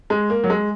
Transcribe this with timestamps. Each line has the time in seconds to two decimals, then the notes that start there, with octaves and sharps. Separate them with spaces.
0.10 G#3
0.30 A#3
0.44 F#3
0.50 G#3